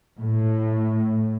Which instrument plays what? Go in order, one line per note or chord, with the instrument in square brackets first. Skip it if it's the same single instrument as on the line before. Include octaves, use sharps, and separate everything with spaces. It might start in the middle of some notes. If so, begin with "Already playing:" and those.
[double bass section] A2